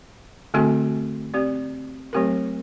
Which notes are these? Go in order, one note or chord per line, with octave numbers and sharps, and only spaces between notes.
D3 A3 C4 F#4 A4
C4 G4 D5
F#3 A3 C4 G4 A#4